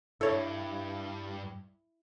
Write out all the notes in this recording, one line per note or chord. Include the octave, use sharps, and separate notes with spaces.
G2 E4 A4 C#5